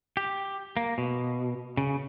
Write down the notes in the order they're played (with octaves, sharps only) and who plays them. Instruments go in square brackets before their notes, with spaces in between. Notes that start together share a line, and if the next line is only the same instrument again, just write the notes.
[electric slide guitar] G4
A#3
B2
C#3